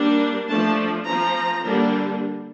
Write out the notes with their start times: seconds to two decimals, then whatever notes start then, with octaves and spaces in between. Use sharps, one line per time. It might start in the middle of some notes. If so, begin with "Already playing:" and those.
Already playing: G3 A#3 D4
0.49 F3 A3 D4 A5
1.07 F3 C4 A#5
1.66 D3 G3 A#3 D4